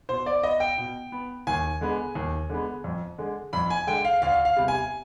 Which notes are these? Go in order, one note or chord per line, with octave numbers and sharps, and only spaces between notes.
B2 C5
D5
B3 D#5
G5
B2
B3
D#2 G#5
D3 G#3 B3
D#2
D3 G#3 B3
F2
D3 G#3
F2 B5
G#5
D3 G#3 G5
F5
D2 F5
F5
C3 G3 B3
G#5